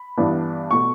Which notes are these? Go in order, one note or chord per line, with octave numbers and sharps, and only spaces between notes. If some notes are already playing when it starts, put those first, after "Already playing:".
Already playing: B5
G2 E3 B3 D4
B2 A3 C#6